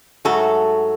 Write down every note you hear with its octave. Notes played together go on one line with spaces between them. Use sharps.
G#2 F#3 A3 F#4 A4